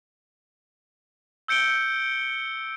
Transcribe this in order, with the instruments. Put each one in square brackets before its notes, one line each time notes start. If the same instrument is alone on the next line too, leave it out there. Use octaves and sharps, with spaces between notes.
[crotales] E6 G6 C#7 D7 G7